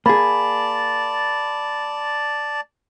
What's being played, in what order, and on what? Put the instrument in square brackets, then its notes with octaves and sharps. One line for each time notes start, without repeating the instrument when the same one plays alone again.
[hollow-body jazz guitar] A#3 G#4 [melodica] D5 A5 [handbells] B5